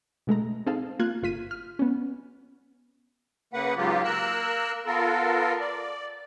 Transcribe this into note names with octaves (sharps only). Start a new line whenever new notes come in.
B2 G#3 A3 A#5
C4 D#4 G#4 A4 F5
A#3 F4 F5 F#6 G#6
G1 F4 B6 D#7
F6
B3 C#4
C#3 A#3 B4 F#5
G#2 C#3 F#3 A#3 F4 G4
A#3 A#4 E6 F#6
B3 F4 A4 A#4
D5